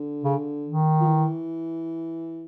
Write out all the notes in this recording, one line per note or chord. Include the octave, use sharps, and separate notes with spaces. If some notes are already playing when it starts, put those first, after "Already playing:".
Already playing: D3
C#3
D#3
F3
E3